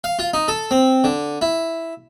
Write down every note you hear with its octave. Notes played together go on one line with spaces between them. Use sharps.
F5
F4
D#4
A4
C4
D3
E4